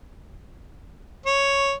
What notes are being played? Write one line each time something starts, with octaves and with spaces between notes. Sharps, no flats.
C#5